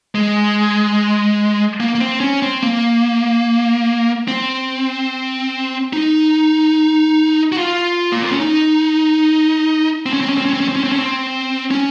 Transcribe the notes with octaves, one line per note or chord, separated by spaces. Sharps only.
G#3
A#3
A#3
C4
C#4
C4
A#3
C4
D#4
F#4
F4
A#3
C4
C#4
D#4
C4
C#4
C4
C#4
C4
C#4
C4
C#4
C4
C#4
C4
C#4
C4
C#4